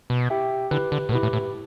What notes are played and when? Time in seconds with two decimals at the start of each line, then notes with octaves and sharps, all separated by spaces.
0.10 B2
0.30 E4 G4 E5 G5
0.71 D3 E4 G4 B4
0.92 D3
1.09 A2
1.12 B2 E4 G4 B4
1.23 A2
1.33 A2